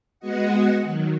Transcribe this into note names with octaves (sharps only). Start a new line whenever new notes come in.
G#3 B3 F#4 D#5 F#5
D#3 F#3